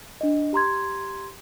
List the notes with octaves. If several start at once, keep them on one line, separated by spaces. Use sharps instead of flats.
D4 D#5
G4 A#5 C6 G#6